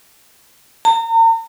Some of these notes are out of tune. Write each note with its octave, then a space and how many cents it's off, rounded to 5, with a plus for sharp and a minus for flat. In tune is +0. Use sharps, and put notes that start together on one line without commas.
A#5 -40